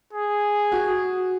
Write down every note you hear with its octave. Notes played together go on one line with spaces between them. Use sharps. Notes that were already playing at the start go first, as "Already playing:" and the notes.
G#4
F#4